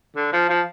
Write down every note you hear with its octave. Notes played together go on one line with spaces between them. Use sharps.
D3
F3
F3